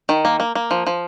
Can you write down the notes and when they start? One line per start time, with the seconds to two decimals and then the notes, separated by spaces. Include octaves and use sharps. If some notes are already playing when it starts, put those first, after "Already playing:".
0.09 D#3
0.25 A#3
0.40 A#3
0.55 A#3
0.71 F3
0.87 F3